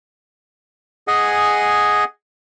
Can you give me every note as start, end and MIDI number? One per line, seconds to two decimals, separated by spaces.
1.08 2.04 68
1.08 2.04 75
1.08 2.04 78
1.08 2.04 80